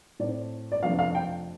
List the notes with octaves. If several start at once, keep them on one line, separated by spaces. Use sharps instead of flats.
A2 A3 C4 D5
D5
F2 C3 F3 A3 D4 F5
F5
G5